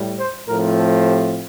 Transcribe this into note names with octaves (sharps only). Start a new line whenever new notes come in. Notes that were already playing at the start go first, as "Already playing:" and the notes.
Already playing: A2 G3
C5
A2 F3 A3 C4 A#4
A4
G4